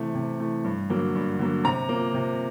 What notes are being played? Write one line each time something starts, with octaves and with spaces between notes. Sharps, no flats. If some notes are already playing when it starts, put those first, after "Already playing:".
Already playing: C3 E3 A3
C3
E3 A3
G2
D3 F#3 A#3
G2
D3 F#3 A#3
C3 A#5
F3 A#3
C3